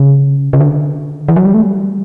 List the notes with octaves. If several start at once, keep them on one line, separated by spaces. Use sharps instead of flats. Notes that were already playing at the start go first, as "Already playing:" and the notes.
Already playing: C#3
C#3
D3
E3
F#3
G3
A3
G3